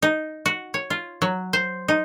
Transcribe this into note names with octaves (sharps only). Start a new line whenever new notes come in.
D#4
F#4
C#5
F4
F#3
C5
D#4